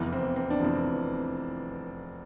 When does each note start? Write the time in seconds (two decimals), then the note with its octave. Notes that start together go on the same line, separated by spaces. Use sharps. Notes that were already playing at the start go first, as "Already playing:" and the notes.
Already playing: F1 E2 E3
0.12 C4
0.36 C4
0.50 D4
0.60 F1 E2 E3 C4